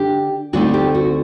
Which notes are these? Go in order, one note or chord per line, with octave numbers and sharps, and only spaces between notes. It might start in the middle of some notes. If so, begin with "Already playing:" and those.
Already playing: D3 D4 G4
D2 D3 A3 C4 D#4 F#4
G4
F#4